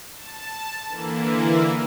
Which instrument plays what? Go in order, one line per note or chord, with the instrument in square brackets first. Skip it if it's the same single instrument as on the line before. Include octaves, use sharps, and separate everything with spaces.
[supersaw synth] A5
D3 E3 A#3 E4